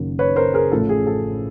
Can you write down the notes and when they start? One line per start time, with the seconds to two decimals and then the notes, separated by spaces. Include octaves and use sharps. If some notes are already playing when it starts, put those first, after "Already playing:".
Already playing: F#1 F#2 D#3 F#3 A#3
0.19 B4 C#5
0.36 A#4 C5
0.54 G#4 A#4
0.72 A1 A2 F3 A4
0.89 G#4
1.07 A4